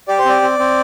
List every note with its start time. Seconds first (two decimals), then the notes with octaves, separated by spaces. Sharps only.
0.08 G4 D5
0.19 C5
0.25 C4 D5
0.42 C4
0.59 C4